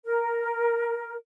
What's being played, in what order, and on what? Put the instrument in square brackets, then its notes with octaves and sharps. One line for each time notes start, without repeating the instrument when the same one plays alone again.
[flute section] A#4